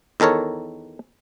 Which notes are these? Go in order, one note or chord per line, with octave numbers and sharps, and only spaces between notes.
E2 D#3 A4 A#4 C#5